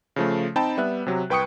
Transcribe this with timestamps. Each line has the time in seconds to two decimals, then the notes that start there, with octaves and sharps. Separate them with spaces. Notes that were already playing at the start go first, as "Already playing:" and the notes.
0.16 C#3 F3 A3
0.56 C4 D#4 G5 A5 B5
0.77 G3 B3 E5 F#6
1.06 C3 F#3
1.30 C2 B4 G5 C#6 D#6 C#7